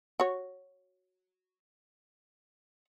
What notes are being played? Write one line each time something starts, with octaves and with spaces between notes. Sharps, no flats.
F#4 C#5